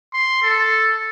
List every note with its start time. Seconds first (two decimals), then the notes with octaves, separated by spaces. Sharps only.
0.14 C6
0.43 A4